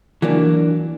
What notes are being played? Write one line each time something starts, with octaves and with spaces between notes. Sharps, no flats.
E3 F#3 A#3 D4